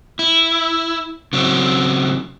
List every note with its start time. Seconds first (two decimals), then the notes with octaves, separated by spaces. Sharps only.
0.19 E4
1.33 C#3 F#3 C4